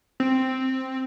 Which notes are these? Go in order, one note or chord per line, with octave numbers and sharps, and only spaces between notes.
C4